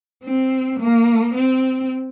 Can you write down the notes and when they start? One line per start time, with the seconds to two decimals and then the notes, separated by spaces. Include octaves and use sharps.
0.23 C4
0.80 A#3
1.34 C4